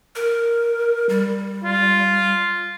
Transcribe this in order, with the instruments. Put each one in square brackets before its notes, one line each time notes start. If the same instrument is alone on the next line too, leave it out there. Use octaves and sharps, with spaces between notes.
[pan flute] A#4
G3
[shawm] F4